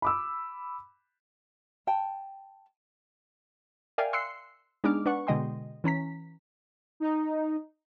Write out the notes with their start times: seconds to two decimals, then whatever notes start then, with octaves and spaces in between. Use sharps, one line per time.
0.02 B5 D6 E6
1.87 G5 A5
3.98 A#4 D5 E5 F5 G5 G#5
4.13 C6 E6 F#6 C7 C#7
4.84 G#3 B3 D4 D#4 D6 F6
5.06 D4 B4 F#5 C#6
5.27 B2 D3 G#3 D#5 G5 C6
5.84 E3 C#4 A#5 B6
7.00 D#4